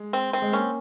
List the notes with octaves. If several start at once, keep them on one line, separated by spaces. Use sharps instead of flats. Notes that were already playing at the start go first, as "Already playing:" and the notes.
Already playing: G#3
C4
C4
G#3
A#3 C#4